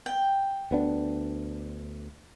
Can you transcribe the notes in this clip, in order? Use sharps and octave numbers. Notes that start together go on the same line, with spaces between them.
G5
D2 B3 D4